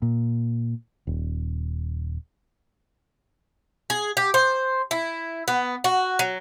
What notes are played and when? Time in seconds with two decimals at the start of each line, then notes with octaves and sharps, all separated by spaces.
0.02 A#2
1.07 D#1
3.90 G#4
4.17 G4
4.34 C5
4.91 E4
5.48 B3
5.84 F#4
6.19 F#3